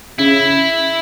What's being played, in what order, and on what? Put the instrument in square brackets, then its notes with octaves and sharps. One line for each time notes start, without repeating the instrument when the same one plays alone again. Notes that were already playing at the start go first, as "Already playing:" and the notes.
[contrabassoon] C#3 [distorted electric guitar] E4